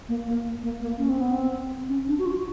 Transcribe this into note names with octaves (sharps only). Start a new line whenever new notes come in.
A#3
A#3
A#3
A#3
C#4
C4
B3
C4
C#4
D4
F#4
F4
F#4